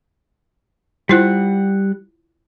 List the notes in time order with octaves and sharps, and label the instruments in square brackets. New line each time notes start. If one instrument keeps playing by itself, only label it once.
[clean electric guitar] G3 F#5 [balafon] E4 F4 C5